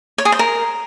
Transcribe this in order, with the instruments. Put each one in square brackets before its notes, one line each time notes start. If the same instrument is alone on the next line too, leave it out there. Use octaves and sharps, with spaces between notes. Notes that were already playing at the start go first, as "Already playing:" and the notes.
[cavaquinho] C#5
G#4
C5
A#4